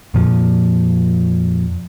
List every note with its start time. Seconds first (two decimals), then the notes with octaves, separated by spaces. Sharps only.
0.14 F2 A#2 F3